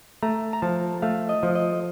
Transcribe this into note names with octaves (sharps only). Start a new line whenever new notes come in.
A3 A#5
A#5
F3 A5
A3 F5
D#5
F3
D#5